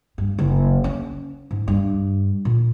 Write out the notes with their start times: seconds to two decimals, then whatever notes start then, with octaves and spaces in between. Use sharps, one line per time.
0.18 G2
0.38 F#1
0.84 C#4
1.51 G#2
1.68 G2
2.45 A#2